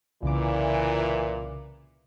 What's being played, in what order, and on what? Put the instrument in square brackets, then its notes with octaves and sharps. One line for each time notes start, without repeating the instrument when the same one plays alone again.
[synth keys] C2 C#3 D6 [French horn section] A#2 E3